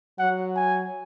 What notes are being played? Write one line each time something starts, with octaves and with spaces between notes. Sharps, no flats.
F#3 F#5
G#5